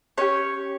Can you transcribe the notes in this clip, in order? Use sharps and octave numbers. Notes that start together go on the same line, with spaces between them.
C#4 G4 C#5